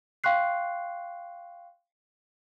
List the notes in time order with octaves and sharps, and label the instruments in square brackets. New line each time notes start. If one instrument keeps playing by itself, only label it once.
[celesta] F5 G5 C6 C#6 F#6 C7